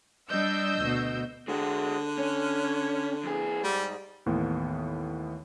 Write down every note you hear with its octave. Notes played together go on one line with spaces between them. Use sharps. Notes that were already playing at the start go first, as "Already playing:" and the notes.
G3 D4 D#5 E6 G6
D2 B2
D3 G#3 F#4
C#4
F2 G#4
G#2 G3
D#2 A2 E3 B3